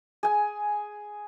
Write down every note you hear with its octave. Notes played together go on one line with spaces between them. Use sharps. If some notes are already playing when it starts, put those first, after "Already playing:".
G#4 G#5